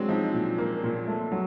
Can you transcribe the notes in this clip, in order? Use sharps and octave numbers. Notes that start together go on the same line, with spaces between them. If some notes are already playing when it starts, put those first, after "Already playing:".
Already playing: F#3 G#3 C4 D4
F3 D#4
A#2
A#3
A#2
A3
F#3